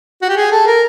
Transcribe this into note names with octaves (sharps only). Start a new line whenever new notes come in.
F#4
G4
G#4
A4
A#4